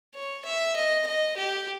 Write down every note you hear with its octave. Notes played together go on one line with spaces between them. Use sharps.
C#5
E5
D#5
D#5
G4